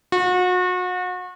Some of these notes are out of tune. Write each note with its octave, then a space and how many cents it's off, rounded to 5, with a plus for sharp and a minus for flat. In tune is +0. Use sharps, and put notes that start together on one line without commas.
F#4 -35